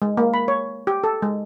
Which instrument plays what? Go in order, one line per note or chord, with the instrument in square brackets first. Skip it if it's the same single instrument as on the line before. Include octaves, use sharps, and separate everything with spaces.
[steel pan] G#3
A#3
B5
C#5
G4
A4
G#3